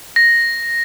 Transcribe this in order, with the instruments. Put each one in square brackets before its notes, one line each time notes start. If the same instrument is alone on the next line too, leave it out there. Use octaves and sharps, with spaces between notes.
[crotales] A#6